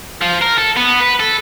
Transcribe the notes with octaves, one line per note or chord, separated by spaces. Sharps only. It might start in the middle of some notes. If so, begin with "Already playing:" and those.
F3
A#4
A4
B3
B4
A4